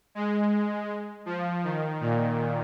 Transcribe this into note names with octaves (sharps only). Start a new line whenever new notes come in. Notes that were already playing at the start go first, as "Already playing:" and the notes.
G#3
F3
D#3
A#2